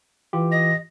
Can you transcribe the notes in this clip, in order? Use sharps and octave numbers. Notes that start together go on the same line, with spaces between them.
E3 F4 G4
D#5 A#6